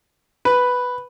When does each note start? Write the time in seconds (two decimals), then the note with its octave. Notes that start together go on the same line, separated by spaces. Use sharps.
0.45 B4